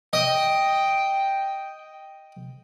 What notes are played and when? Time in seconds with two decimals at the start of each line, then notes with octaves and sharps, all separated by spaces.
0.13 D#5 G5